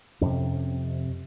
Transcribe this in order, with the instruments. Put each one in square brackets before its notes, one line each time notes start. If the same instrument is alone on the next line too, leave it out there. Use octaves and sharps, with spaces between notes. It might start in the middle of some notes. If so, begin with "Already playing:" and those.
[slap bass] F2 C3 C#4